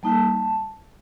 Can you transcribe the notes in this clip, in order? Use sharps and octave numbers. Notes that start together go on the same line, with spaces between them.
G3 A#3 D#4 A5